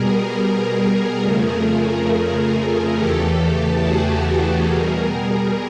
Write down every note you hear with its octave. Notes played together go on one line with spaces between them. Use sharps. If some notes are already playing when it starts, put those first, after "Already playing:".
Already playing: B2 G3 G#4 A#4
F2 C#3 F3 A3 G#4 A#4
E2 C#3 E3 A3 G4 A4
F#4 G#4
G4 A4
B2 G3 G#4 A#4